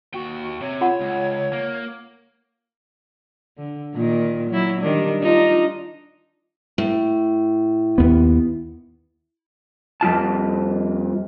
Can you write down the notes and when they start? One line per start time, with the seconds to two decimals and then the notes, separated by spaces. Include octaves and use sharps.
0.14 D#2 F#4 G5
0.61 C3 C#5
0.81 F4 F#5
1.00 C#2
1.53 A#3
3.58 D3
3.94 A#2 D#3
4.50 F#3 E4
4.81 D#3 G3 D4
5.22 D4 D#4 F4
6.78 A2
7.98 D#2 B3
10.01 F2 G3 F4 A5